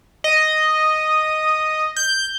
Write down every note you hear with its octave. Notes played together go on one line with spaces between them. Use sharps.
D#5
G6